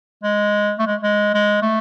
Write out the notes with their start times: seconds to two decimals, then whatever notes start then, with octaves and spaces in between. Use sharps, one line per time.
0.24 G#3
0.79 A3
0.87 G#3
1.03 G#3
1.34 G#3
1.62 A3